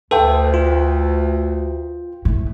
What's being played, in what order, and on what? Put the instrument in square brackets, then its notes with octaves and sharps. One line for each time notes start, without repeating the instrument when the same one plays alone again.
[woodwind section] D2 [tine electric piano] A4 [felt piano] B4 G5
[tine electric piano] F4
[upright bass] A2